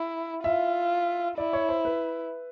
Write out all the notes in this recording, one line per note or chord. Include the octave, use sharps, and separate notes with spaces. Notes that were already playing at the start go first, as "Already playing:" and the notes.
Already playing: E4
F4 E5
E4 D5
C#5
C5
B4